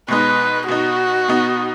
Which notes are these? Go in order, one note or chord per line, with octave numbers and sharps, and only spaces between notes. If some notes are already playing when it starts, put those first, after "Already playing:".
B2 G#3 D#4 B4
B2 B3 D#4 F#4
B2 B3 D#4